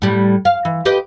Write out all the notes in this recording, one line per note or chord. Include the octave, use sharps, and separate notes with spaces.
A2 G3
F5
E3
G4 B4 D#5